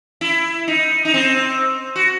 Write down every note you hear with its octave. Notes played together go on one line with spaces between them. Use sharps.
E4
D#4
D#4
C4
F#4